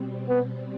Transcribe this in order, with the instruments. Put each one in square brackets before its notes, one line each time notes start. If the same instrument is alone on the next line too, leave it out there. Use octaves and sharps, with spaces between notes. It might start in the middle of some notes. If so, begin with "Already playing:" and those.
Already playing: [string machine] B2 G3 C4
[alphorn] B3